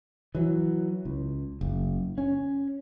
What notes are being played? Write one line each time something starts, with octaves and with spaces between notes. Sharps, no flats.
E3 F#3
C#2
F#1
C#4